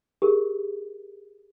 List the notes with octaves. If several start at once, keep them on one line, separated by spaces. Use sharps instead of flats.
G4 G#4 A#4